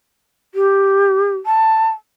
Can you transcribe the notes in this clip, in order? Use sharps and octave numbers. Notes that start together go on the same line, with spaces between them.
G4
A5